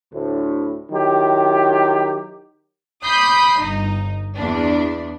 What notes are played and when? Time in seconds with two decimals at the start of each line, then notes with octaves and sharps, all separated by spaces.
0.13 D2 A2
0.91 D#3 F#3 E4 G4
3.04 B5 D6 D#6 G6 B6 C7
3.59 G1 D#4
4.36 E2 D4